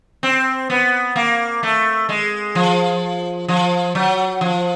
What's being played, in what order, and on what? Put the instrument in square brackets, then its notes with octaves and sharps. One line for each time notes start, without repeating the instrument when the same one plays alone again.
[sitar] C4
B3
A#3
A3
G#3
F3
F3
F#3
F3